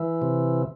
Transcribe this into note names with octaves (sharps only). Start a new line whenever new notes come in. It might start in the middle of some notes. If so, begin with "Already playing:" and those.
Already playing: E3
C3